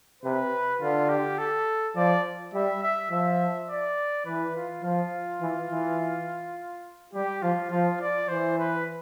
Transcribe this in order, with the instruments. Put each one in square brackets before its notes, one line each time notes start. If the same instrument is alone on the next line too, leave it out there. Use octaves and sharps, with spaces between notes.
[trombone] C3 [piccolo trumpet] B4
[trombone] D3 [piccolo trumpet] F4
[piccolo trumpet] G4
A4
[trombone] F3 [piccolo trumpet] D5
[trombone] G3 [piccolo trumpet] E5
[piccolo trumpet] E5
[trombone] F3 [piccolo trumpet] E5
[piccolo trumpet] D5
[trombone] E3 [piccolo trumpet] B4
[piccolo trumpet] F4
[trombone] F3 [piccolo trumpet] F4
[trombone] E3
E3
[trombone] G3 [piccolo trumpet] G4
[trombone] F3 [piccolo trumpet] F4
[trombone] F3 [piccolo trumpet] F4
[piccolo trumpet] D5
[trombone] E3 [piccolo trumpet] C5
[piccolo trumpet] B4